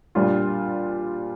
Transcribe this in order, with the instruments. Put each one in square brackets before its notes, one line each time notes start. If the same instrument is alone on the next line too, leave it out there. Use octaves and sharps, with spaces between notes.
[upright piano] A#2 G3 D4 F4